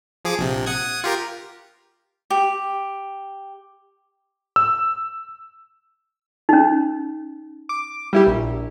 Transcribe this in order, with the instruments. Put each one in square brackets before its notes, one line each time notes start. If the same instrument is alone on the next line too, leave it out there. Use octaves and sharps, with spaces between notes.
[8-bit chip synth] F3 G#4 D6
A#1 C3
F#5 D#6 G#6
F4 G4 A#4
[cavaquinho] G4
[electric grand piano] E6
[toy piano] C#4 D#4
[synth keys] D6
G3 E4 G4
A#1